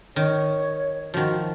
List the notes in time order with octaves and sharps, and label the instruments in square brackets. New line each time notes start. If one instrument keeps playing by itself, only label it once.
[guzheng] D#3 [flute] C#5
[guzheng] D#3 F3 [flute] F#4